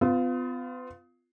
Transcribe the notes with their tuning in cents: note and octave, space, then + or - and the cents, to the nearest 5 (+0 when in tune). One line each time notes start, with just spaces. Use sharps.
B3 +40 F4 +0